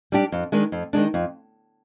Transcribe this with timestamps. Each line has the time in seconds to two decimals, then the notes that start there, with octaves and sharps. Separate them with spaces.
0.12 G3 D4 G4
0.32 F2
0.52 D#3 G#3 D4
0.72 F2
0.93 D#3 G#3 D4
1.14 F2